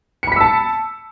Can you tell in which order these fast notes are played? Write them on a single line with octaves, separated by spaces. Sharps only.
C#7 B5 B6 E6 A5